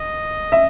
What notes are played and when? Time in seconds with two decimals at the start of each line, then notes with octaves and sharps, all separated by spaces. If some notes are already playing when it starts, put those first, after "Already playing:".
Already playing: D#5
0.52 E5